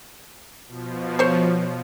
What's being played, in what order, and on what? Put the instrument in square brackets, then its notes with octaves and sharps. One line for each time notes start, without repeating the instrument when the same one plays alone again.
[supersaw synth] B2 F3
[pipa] C5 C#5